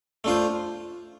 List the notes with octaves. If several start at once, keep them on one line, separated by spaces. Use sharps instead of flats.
A3 D4 F4 C5